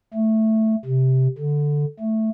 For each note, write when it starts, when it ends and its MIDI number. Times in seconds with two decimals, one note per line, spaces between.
0.14 0.75 57
0.85 1.27 48
1.39 1.85 50
2.00 2.30 57